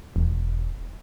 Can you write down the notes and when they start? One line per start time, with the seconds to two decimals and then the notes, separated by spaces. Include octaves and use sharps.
0.16 E1